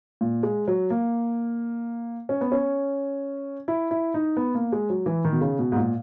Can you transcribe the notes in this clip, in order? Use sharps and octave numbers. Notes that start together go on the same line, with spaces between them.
A#2
G#3
F#3
A#3
C#4
B3
C#4
E4
E4
D#4
B3
A#3
G#3
F#3
E3
D#3
B2
C#3
B2
G#2
A#2